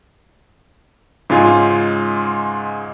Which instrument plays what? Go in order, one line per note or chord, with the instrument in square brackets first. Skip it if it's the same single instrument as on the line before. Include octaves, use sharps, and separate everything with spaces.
[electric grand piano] G#2 C#3 G#3 F4 G#5